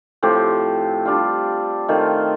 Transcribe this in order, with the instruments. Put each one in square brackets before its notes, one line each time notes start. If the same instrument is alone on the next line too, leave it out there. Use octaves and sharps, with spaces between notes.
[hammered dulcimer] A2 F3 C4 G4
G3 D4 F4
D#3 A3 C4 F4